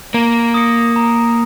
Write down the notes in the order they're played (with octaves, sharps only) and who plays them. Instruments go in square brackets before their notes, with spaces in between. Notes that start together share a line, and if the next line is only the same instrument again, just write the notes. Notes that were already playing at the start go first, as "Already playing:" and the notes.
[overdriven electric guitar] A#3 [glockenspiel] A#5
[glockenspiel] D#6 A#6 C#7
A#5